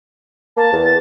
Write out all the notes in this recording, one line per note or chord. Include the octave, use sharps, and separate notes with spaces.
A#3 A5
E2
A6